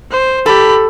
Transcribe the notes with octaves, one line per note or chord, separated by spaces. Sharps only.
C5
G4 A4 B5